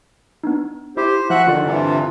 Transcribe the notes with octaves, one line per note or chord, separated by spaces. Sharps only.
B3 D4 D#4
E4 G4 C5
F3 F#4 E5 F#5 F#6
D3 D#3 F4 D5
G2 C3 E3 F4 D5